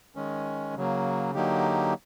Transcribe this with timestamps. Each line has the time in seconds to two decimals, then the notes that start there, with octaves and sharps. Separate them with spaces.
0.16 D#3 G#3 C#4
0.76 C#3 F#3 A#3
1.34 D3 F#3 A#3 D#4 G4